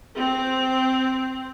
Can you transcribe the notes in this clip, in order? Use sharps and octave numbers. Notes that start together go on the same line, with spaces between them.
C4